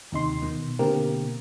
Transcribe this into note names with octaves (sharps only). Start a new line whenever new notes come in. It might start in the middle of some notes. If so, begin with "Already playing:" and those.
D#2 C3 D#4 C6
B2 D#3
B2 D3 A#3 C4 G4 A#4